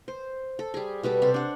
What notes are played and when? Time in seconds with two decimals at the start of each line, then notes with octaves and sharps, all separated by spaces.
0.08 C5
0.59 A4
0.74 G3 G#4
1.03 B2 G3 B3 A4
1.22 C3 A4 C5 A5
1.34 D4 F#5